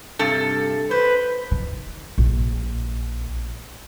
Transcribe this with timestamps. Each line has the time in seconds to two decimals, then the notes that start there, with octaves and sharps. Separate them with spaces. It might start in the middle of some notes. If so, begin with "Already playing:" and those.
0.19 G2 C3 A4
0.91 B4 C5
1.51 D#3
2.18 A#1